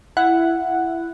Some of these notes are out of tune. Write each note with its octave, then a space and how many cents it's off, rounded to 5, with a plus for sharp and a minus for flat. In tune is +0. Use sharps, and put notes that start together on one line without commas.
E4 +15 F#5 +0